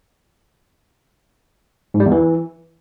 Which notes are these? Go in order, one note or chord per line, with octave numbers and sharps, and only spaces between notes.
G#2
G3
E2
E3